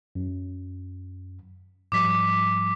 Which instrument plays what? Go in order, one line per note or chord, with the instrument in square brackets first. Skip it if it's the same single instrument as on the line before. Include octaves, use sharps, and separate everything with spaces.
[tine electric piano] F#2
[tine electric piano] G#2 F3 G3 [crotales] D6 B6